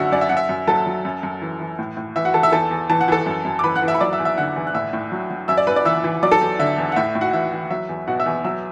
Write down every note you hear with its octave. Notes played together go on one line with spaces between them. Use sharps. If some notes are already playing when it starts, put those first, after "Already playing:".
Already playing: F#2 D3 F#3 F#4 E5 F#5 E6
F#2 D5
E5
F#2 F#5
E5
F#2
F#3 A4 A5
F#3
F#2
F#2
E3
E3
A2
A2
E3 E5
F#4 F#5
E3 A4 A5
E5 E6
E2 A4 A5
E2
E3 A5
F#5
E3 A4 A5
F#2
F#2
D6
E3 B4 B5
F#5 F#6
E3
E5 E6
B5
F#3 D5 D6
E5 E6
E2
E5 E6
D3 F#5 F#6
E2
F#6
A2 E5 E6
A2
F#3
F#3
F#2 E5 E6
D5 D6
F#2 B4 B5
D5 D6
E3 E5 E6
E3
F#3 D5 D6
A4 A5
E2
D3 E5
E2
F#5
A2 E5
A2
F#4 F#5
E3 E5
E3
F#3 E5
E2
B2 F#4 F#5
E5 E6
E2
F#3 E5 E6